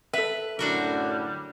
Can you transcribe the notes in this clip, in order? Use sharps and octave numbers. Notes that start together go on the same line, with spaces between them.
A4 B4 E5
F#2 A2 D3 G3 D4 F#4 A#4